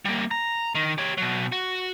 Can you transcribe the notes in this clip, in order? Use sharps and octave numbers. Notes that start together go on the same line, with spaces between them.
G3 A#3
A#5
D#3
G4 C#5
B2 F#3
F#4